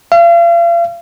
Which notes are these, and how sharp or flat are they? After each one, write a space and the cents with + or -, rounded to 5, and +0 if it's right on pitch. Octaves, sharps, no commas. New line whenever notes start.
F5 -40